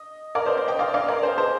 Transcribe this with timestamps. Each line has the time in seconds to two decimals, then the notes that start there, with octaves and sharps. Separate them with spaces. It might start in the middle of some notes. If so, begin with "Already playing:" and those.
Already playing: D#5
0.35 A#4 D5
0.46 C5 D#5
0.57 C5 D#5
0.68 D#5 G5
0.79 D5 F5
0.94 D5 F5
1.08 A#4 D5
1.23 G#4 C5
1.38 C5 D#5